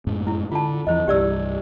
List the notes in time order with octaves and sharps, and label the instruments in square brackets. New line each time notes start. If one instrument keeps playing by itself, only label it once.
[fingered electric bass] F#2 A2 G#3
[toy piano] E4
[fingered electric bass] D3 [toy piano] F4 A5
[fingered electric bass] E2 F3 [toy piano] E4 C5 D#5
[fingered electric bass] C2 G2 [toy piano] G4 D5 E6